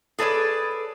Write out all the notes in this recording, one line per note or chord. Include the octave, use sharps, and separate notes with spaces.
G#4 A4 B4 C#5 D5